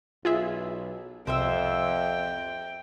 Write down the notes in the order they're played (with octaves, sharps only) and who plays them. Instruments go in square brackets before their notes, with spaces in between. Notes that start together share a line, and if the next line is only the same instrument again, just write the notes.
[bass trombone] B1 [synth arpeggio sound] F4 G#4 E5
[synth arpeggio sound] C2 [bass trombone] F2 [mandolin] C5 E5 E6 [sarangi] G5